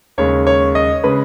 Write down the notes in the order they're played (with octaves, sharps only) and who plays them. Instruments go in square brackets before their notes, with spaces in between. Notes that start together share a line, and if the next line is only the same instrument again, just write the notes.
[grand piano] D#2 C#3 G#3 C#5
C#5
D#5
C#3 G#3 B4